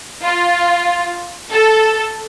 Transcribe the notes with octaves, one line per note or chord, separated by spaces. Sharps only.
F4
A4